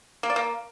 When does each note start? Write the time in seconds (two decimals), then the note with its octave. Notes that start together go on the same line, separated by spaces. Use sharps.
0.23 A#3
0.30 D5
0.36 A#3